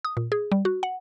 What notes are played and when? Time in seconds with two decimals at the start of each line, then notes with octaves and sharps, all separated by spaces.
0.05 D#6
0.17 A#2
0.32 G#4
0.52 G3
0.65 F#4
0.83 F#5